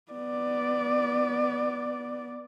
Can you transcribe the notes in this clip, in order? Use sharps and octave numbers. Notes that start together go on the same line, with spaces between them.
B3 D5